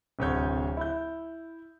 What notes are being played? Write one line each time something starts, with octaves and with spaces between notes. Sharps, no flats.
D1 D2 C3 C#5 G6
E4 G6